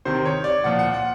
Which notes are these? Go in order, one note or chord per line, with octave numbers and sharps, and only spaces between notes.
C3 D#3 C5
C#5
D5
A#2 F3 F#5
F#5
F#5